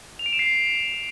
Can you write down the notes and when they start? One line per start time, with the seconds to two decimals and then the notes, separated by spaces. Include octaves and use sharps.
0.19 F7
0.26 D7
0.33 E7
0.39 C7